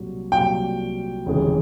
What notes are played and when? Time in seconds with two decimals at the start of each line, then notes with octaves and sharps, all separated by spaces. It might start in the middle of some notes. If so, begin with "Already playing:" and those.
Already playing: C2 A#2 F#3
0.32 C2 A#2 F#3 G5
1.26 F1 D#2 C#3 E3 G#3